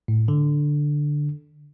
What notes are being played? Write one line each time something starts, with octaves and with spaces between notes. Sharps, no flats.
A2
D3